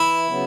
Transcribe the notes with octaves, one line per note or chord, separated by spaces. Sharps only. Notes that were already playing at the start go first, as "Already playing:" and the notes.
Already playing: E3 E4
C#3 F#3 B3